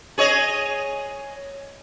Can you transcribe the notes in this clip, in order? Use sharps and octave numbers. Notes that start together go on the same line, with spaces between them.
G#4 C#5 D#5